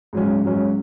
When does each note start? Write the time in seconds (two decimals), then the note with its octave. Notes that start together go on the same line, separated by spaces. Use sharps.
0.13 G#2 F#3 C#4
0.43 G#2 F#3 C#4